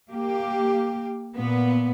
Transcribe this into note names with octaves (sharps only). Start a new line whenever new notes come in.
A#3 G4
A#2 B3